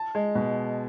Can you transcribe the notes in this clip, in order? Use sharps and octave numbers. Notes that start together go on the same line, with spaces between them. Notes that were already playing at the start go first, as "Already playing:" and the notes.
Already playing: A5
G#3
B2